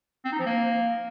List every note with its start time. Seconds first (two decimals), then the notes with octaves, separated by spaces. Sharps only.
0.25 C4
0.32 D#4
0.39 F3
0.46 A#3